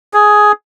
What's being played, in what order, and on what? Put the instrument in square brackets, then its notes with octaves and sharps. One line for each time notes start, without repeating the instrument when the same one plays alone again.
[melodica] G#4